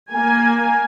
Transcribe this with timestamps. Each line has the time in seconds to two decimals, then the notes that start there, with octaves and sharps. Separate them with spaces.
0.13 A#3 G#5